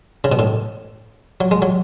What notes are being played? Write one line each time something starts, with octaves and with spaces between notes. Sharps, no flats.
C#3
B2
A2
F#3
G#3
F#3